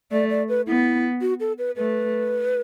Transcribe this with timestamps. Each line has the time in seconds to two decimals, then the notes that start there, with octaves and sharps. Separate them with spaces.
0.11 A3 D5
0.30 D5
0.49 B4
0.67 B3 E4
1.21 F#4
1.40 A4
1.58 B4
1.76 A3 B4